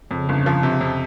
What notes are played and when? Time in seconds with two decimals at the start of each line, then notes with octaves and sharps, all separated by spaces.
0.11 F2 C#3
0.29 G1
0.46 F3
0.63 C3
0.81 F2